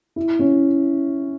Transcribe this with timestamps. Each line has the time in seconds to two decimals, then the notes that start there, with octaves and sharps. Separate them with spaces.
0.16 E4
0.39 C#4